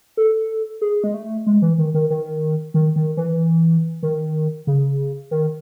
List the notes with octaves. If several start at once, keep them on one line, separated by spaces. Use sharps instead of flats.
A4
G#4
G#3
A3
G#3
E3
D#3
D#3
D#3
D#3
D#3
E3
D#3
C#3
D#3